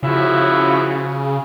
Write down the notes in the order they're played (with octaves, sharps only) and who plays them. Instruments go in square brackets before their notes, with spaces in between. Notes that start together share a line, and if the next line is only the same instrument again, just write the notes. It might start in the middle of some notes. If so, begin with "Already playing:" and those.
[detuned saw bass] C#3 [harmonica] F3 E4 F#4